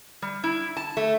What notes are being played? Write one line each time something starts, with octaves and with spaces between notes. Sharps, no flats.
G3
E4
A5
A3